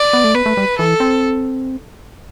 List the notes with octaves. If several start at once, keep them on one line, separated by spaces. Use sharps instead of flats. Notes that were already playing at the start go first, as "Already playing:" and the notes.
Already playing: D5
B3
A3
B3 B4
A3
G3
E3 A4
C4